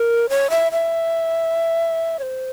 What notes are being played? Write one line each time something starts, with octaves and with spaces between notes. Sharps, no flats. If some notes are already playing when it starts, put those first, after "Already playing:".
Already playing: A#4
C#5
E5
E5
C#5
C5